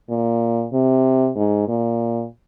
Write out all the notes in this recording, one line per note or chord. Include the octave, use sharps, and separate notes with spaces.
A#2
C3
G#2
A#2